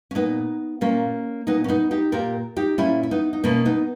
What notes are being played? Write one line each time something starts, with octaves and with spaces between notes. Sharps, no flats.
C#4
A#2 B3 D#4
A#2 A#3 C#4
A#2 B3 D#4
C#4
B3 D#4
D#4 G4
A#2 G4 A#4
D#4 G4
A#2 C#4 E4
E4
B3 D#4
D#4
B2 A#3 C#4
B3 D#4